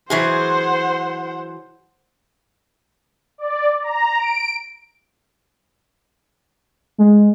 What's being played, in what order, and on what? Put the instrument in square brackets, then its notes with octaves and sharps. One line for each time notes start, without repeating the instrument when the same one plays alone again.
[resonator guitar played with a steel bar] E3 F#3 G#4 [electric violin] C5 F#5
[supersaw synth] D5
A#5
D7
[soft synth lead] G#3